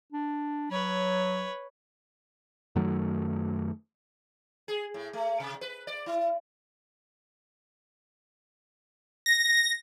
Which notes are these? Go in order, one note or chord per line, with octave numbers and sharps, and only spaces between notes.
D4
F#3 B4 C#5
F#2 D#3 F#3 A3
G#4
A2
A3
C3
B4
D5
E4
A#6